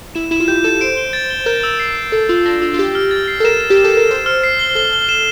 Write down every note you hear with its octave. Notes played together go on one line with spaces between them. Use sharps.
E4 E7
E4 E7
F4
G4 G6
A4 E7
C5 D7
G7
A6
G7
A#4 G6
E6
C7
E6
A4 E6
F4 E6
D4 A#6
F4 E6
F4
G4 C7
F6
A6
C7
A4
A#4 E7
E7
G4
E7
A4
A#4 E7
C5 E7
F6
C7
G7
A4 G7
G7
E7